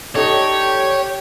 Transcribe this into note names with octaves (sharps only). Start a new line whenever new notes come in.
D#4 G4 A4 C#5 D5